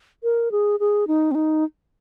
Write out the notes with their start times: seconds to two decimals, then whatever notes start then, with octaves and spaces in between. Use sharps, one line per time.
0.23 A#4
0.51 G#4
0.80 G#4
1.07 D#4
1.31 C4
1.35 D#4